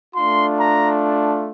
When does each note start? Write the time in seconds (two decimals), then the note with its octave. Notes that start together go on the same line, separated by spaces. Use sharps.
0.14 A3 D4 F4 C6
0.59 A#5
1.02 A5